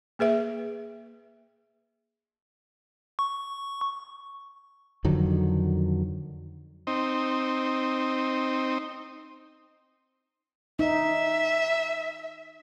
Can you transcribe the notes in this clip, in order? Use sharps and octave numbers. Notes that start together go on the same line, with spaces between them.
A#3 G#4 B4 E5
C#6
F2 D3 D#3 F#3
C4 D#4
D#4 E5